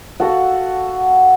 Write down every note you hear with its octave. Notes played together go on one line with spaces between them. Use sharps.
F#4 A4 F5 F#5